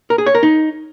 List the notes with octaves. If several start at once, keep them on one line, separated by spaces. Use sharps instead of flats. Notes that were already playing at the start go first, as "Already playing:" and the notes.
A#4
G#4
C#5
A#4
D#4